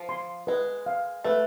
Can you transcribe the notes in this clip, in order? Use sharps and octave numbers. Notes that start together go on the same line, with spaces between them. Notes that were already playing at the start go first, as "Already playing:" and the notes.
Already playing: F3
C6
G#3 B4
F5
A3 B4